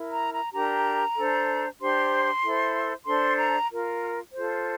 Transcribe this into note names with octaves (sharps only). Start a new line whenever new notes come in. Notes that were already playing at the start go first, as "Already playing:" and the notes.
Already playing: E4 A#4
A#5
A#5
D4 G4 A#4 A#5
D4 A4 C5
D4 G4 C5 C6
E4 A4 C5
D4 A4 C5 C6
A#5
F4 A#4
F4 A4 C5